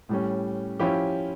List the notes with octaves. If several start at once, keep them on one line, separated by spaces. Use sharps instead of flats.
A2 G3 C#4
F3 C#4 E4 G4